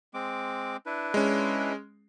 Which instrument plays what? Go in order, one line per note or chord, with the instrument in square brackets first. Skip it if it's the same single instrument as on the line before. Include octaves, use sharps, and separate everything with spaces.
[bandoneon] G#3 C4 D6
D4 E4 B4
[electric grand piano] G#3 C#4